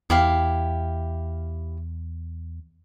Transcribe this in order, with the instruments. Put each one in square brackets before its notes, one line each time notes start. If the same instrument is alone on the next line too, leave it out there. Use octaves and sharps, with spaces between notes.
[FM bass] E2 [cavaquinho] E4 G4 F5